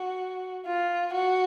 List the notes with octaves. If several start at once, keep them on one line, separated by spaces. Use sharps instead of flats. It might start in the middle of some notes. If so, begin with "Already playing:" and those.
Already playing: F#4
F4
F#4